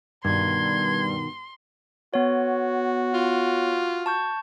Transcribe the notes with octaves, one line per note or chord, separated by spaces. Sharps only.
G2 B2 D#3 C6 G#6
B3 F#4 C#5
F4
A5 C#6 G6